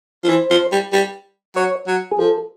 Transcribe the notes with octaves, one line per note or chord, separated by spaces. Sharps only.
F3
E3 C5
F3
G3
G3
F#3 C#5
F#3
G#4
F3 A4